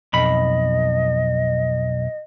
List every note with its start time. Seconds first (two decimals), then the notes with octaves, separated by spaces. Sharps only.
0.13 B1 F2 D#5 B5